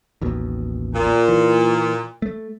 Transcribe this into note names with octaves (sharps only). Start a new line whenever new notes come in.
A1 D#2 B2
A#2
E3
A3